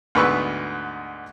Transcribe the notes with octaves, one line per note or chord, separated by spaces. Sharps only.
D2 G#2 B3 B4 C#6 E6